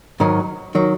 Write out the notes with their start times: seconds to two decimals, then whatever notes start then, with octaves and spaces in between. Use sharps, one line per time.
0.20 G#2 D#3 F#3
0.75 D#3 F#3